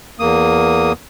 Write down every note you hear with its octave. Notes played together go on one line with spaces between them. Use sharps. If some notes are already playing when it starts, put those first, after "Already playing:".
E2 A#3 D#6